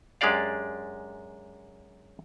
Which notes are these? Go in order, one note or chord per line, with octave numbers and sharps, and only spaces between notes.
F#2 G#3 D4 G4 D5 F5